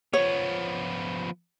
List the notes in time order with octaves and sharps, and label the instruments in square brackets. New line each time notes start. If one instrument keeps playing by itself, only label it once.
[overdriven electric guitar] F3 B3 [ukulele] C#5